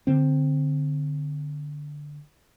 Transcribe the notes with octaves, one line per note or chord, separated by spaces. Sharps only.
D3 C4